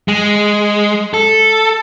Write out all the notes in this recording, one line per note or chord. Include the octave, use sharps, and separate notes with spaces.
G#3
A4